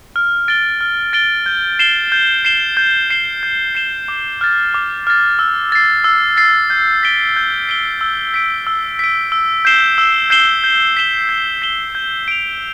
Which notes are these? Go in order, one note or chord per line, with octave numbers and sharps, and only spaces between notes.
F6
A6 D7 G7
F6
A6 D7 G7
G6
C7 E7 G7
G6
C7 E7 G7
G6
C7 E7 G7
G6
C7 E7 G7
D6
F6 A6
D6
F6 A6
E6
A6 C7
E6
A6 C7
G6
B6 D7 G7
G6
B6 D7 G7
E6
B6 D7
E6
B6 D7
E6
G6 C7 E7 G7
E6
G6 C7 E7 G7
G6
B6 E7 G7
G6
B6 E7 G7
G6
D7 F7